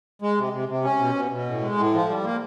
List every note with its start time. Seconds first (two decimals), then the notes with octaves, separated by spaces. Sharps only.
0.22 G#3
0.37 C3
0.53 C3
0.69 C3
0.84 C#4
1.00 B2
1.15 B2
1.32 B2
1.47 A2
1.62 G#3
1.77 A2
1.94 F3
2.09 G3
2.24 A#3